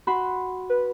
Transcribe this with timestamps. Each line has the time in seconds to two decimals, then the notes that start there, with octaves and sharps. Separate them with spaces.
0.07 F#4 B5 C6
0.70 B4